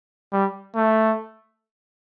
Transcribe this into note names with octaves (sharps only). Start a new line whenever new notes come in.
G3
A3